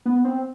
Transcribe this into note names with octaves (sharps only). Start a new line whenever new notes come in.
B3
C4